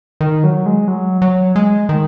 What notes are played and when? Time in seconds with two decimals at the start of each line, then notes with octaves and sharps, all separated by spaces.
0.21 D#3
0.44 F#3
0.66 G#3
0.88 F#3
1.22 F#3
1.56 G#3
1.89 D#3